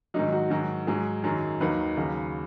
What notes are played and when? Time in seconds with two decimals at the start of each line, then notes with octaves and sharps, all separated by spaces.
0.14 G#2 D#3 F#3 D#4
0.33 F#4
0.50 G#2 D#3 F#3
0.87 G#2 F#3 G#4
1.24 F#2 D#3 F#3
1.60 D#2 D#3 F#3 B4
1.97 D#2 C#3 F#3